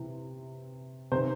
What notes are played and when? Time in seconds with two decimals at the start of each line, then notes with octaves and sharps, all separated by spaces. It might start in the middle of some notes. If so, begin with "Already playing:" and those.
Already playing: C3 E3
1.12 C3 D#3 C5